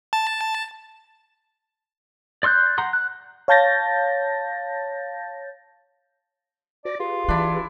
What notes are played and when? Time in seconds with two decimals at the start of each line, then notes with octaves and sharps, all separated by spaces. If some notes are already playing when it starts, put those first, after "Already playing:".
0.13 A5
2.43 D5 C6 E6 F#6 G6
2.78 F#5 A#5 C6
2.93 F#6
3.48 C#5 F5 A5 G6 A6 A#6
6.85 F#4 C5 D5 A#6
7.00 F4 G4 G#4 B4
7.29 E3 D4 E4